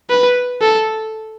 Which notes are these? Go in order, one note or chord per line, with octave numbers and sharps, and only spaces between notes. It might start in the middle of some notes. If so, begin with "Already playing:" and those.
B4
A4